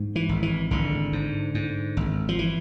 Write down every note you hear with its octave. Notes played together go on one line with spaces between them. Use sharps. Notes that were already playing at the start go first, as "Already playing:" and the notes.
Already playing: G#2
E3
G#1
E3
G#1 D3
G#2
G#2
G#1
F3
E3